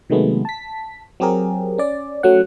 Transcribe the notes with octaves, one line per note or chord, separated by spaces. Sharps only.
C3 D#3 F#3 G#3 A3 B3
A5 B6
F#3 C4 G4 G#4 A#4
C#4 D5
F#3 A3 C#4 F#5